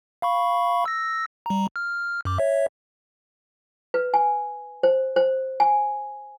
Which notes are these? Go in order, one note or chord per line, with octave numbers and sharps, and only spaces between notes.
F5 B5 C#6
E6 A#6
G3 A#5
F6
F#2 D6
C#5 E5
B4
G#5
C5
C5
G#5